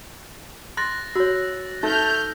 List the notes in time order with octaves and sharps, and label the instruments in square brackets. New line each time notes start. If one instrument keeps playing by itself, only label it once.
[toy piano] C6 [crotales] F#6 A6 A#6
[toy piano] F#4 C#5 [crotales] E6
[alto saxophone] A3 [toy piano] D#4 [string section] F6 G6